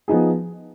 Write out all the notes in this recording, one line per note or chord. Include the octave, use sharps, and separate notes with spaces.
F3 B3 D#4 G#4